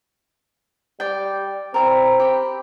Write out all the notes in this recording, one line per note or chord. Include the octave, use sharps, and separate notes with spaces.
G3 G4 D5 G5
C4 E4 A4 A#4
G4 B5